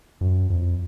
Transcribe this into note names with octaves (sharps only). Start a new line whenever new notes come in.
F#2
F2